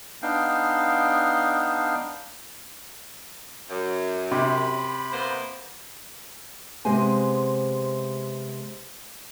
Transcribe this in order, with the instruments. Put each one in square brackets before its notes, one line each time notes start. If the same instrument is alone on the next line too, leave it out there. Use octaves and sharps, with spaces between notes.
[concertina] B3 D4 D#4 F5 G5
[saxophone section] F#2
[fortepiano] C3 [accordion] B5
[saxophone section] A#3 B3 C5
[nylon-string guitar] C3 G#3 B3 G4 C5 G#5